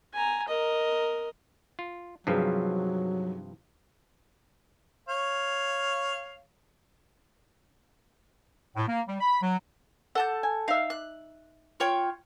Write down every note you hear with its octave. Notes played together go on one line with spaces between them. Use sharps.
G#5 A#5
A#4 D#5
F4
G2 C3 F3 F#3 D#4 G#4 B4
C#5 F5
A2
A#3
G3
B5
F#3
A4 F#5 A5 G6
G#5
D#4 E5 F5
F#6
F4 C#5 G5